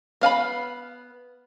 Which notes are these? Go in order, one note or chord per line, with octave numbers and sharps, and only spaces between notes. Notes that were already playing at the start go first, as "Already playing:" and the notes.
B3 F5 G#5 B5